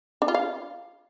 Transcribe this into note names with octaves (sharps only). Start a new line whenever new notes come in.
D4
F4
F5